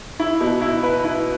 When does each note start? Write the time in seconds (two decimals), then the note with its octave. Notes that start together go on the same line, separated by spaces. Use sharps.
0.19 E4
0.40 B2
0.61 E4
0.83 B4
1.04 E4